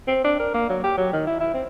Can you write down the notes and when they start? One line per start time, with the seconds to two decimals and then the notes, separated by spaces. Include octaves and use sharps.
0.07 C4
0.24 D4
0.39 A#4
0.54 A#3
0.69 F#3
0.84 G4
0.97 F#3
1.13 D#3
1.27 E4
1.40 E4
1.54 C4